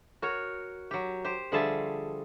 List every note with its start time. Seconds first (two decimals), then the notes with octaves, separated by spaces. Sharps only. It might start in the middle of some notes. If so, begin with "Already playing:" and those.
0.22 F#4 A#4 C#5
0.91 F#3 G4
1.24 G4 C5
1.52 D3 F3 G3 G#4 E5 A5